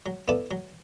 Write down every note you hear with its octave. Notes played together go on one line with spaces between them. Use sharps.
F#3
B3 E4 A4 D5
F#3